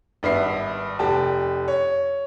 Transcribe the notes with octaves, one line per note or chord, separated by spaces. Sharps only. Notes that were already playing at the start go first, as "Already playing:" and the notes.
G#1 G2 B3 E5 C7
F1 G4 A5
C#5